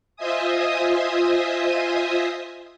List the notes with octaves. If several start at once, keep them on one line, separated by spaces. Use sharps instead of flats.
F4 C5 D#5 E5 G#5 D#6